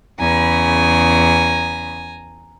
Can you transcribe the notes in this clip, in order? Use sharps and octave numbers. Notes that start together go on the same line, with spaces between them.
E2 C#3 G#5 A#5